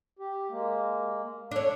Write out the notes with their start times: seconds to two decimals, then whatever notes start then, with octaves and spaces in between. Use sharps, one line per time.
0.19 G4
0.50 G#3 A#3
1.51 D4 A4 C#5